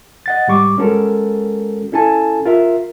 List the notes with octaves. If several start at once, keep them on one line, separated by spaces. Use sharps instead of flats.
D#5 F#5 A6
G#2 G3 C#6 D6
G#3 C#4 F#4 A4 A#4
C#4 E4 A4 G#5 A5
F4 A#4 E5